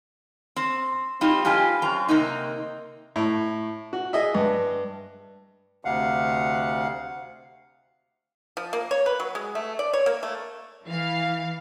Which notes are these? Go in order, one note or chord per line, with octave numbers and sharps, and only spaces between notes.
C4
G3 C4 D#4 F4
G2 F4 G4 G#5
F#2 C4 A#5
C3 A#3 C4 D#4
A2 C#6
F#4
G#4 D#5 E5
G2
D2 C3 F5 F#5
F3
A#3
C#5
B4
F#3
G#3
A3
D5
C#5
A#3
A3
E3 F5